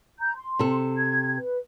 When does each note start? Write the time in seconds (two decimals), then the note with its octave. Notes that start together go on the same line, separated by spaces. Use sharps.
0.19 A#5 G6
0.34 C6
0.59 C3 A4
0.97 G#6
1.36 B4